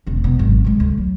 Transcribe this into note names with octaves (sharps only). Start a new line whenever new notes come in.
E1 C#4
B2
G#1 F#2
C#3 G#3
D2
F#3